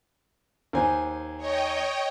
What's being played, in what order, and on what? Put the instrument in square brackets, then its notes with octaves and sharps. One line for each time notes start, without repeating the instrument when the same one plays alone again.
[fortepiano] D#2 C5 G#5
[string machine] C#5 D#5 G5